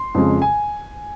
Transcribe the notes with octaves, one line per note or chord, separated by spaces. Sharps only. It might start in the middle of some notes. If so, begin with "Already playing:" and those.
Already playing: C6
F2 C#3 F3 G#3
G#5